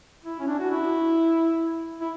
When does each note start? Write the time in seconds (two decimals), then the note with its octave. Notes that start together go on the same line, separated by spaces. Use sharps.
0.24 E4
0.40 C#4
0.47 D4
0.59 F#4
0.70 E4
2.01 E4